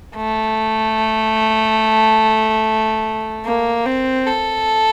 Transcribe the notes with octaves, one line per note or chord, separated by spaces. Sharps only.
A3
A#3
C4
A4